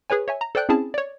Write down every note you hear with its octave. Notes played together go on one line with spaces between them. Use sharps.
G#4 B4 C#5 G#5
C#5 E5 G#5
A#5
A4 C5 D5 G5 F#6 G6
C4 C#4 E4 G#4 A5
C#5 D5